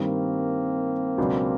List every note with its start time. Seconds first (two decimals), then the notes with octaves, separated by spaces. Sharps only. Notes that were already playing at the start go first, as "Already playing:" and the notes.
Already playing: G2 D#3 G3 A#3 C4
1.18 C#2 B2 F#3 B3 D4